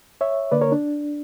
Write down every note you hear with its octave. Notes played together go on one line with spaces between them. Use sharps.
C#5 E5
D3 A#3 B4 D5
A#4 C#5
D4